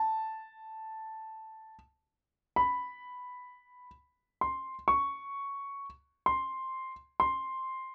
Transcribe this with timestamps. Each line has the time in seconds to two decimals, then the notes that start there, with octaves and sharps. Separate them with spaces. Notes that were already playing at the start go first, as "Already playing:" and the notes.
Already playing: A5
2.56 B5
4.41 C6
4.88 C#6
6.26 C6
7.20 C6